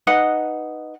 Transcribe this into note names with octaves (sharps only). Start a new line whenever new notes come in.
D#4 B4 D#5 F#5